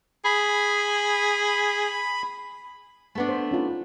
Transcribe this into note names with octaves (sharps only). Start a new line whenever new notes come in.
G#4 B5
A3 B3 D4
C5
C#4 D#4 F4